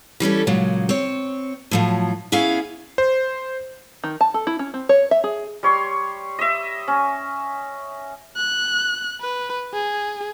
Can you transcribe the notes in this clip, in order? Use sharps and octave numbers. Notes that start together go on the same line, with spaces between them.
E3 G3 C#4 A4
A#2 C#3 F#3 G#3
C4 C#5
A2 F3 F#3
B3 C#4 E4 G#4 F5
C5
D#3
A5
A4
E4
C#4
C4
C#5
E5
G#4
G3 C#5 C6
D#5 E5
C#4
F#6
B4
G#4